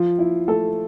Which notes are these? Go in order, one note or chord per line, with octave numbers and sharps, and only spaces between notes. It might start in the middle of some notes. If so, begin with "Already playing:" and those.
Already playing: F3 F4
E4
A3 A4